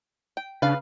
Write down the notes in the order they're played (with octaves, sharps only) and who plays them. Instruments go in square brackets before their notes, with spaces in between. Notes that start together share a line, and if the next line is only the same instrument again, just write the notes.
[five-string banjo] G5
[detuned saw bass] C#3 [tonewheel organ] D4 [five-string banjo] B4 F5